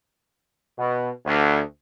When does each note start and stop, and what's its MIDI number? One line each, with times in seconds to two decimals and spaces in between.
0.77 1.09 47
1.25 1.60 38